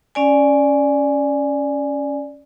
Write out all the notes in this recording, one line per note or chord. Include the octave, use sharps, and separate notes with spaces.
C#4 D5 G#5